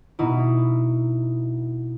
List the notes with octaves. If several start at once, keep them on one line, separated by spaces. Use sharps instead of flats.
B2 D#4 E4